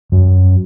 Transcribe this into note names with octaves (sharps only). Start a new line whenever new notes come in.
F#2